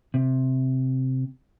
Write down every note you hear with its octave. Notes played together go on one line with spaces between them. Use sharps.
C3